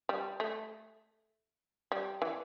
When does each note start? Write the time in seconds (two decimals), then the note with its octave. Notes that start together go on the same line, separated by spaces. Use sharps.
0.09 G3
0.40 A3
1.92 G3
2.22 E3